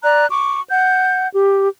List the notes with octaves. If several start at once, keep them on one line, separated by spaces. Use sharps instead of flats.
D5 A#5 F#6
C#6 D6
F#5 G6
G4